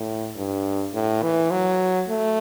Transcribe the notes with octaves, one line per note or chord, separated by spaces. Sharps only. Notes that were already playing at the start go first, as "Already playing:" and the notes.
Already playing: A2
G2
A2
E3
F#3
A3